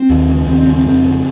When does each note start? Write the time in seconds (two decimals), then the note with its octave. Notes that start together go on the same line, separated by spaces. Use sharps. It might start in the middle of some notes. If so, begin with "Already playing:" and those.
Already playing: C4
0.10 D#2
0.28 C#3
0.47 D#2 C4
0.60 C4
0.66 C#3
0.73 C4
0.86 F2 C4
1.05 C#3